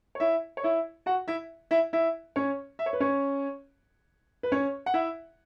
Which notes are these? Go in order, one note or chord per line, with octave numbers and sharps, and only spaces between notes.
C#5
E4 E5
C#5
E4 E5
F#4 F#5
E4 E5
E4 E5
E4 E5
C#4 C#5
E5
C#5
B4
C#4 C#5
B4
C#4 C#5
F#5
E4 E5